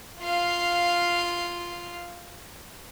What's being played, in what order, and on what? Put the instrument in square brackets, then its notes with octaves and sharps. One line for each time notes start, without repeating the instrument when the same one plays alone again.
[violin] F4 F5